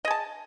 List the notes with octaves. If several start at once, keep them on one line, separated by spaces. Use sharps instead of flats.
G#4 D#5 A5